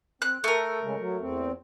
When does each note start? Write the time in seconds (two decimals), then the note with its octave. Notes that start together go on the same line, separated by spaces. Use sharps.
0.22 C4 F#6
0.44 A3 A4 A#4
0.84 C#3 G#3
0.99 F#3
1.21 E2 C4